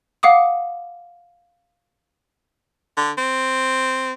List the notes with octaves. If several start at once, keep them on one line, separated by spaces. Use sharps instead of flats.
F5 F#5 D6 D#6
D3
C4